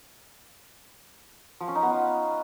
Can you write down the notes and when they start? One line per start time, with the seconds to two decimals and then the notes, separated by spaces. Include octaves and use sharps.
1.61 F3
1.68 C#4
1.75 D#4
1.83 B3
1.90 F4